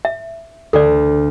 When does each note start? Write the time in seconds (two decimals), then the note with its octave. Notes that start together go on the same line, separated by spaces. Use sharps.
0.05 E5
0.73 D2 A4 D5